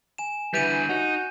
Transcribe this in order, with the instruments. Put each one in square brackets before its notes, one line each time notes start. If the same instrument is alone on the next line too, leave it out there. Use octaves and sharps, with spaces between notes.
[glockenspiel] G#5 E7
[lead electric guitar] D3 G3 [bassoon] E3 [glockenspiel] G6 D#7
[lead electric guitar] D#4 [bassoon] F#4